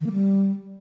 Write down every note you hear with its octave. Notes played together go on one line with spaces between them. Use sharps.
D#3
A#3
G3